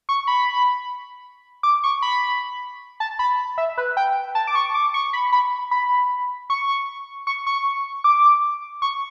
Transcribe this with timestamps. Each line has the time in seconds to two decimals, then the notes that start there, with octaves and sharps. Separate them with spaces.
0.09 C#6
0.27 B5
1.63 D6
1.84 C#6
2.02 B5
3.00 A5
3.19 B5
3.58 E5
3.78 B4
3.97 G5
4.35 A5
4.47 D6
4.55 C#6
4.74 D6
4.94 C#6
5.13 B5
5.32 B5
5.71 B5
6.50 C#6
7.27 C#6
7.47 C#6
8.04 D6
8.82 C#6